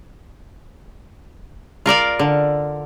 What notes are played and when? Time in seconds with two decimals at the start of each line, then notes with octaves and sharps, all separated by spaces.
1.86 F4 A#4 D5 F5
2.19 D3